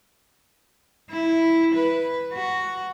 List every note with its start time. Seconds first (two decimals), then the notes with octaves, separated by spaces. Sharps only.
1.10 E4
1.75 B4
2.33 F#4